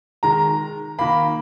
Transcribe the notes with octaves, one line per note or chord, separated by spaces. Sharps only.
D#3 G#3 A#5
D#3 A#3 B5